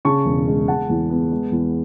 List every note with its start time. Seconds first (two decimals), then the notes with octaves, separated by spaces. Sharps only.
0.05 C#3 A5 C#6
0.26 E1
0.47 G#3
0.68 G#3 F#5 A5
0.90 E2
1.10 B3
1.31 G#3
1.52 E2